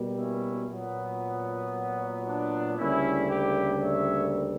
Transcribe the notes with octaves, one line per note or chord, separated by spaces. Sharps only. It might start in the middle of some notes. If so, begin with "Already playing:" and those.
Already playing: B2 G3 A#3
C#4 E4
A#2 F#3 B3
D4
D2 C#3 G3 A#3 C#4 E4
E4 G4
C#5 E5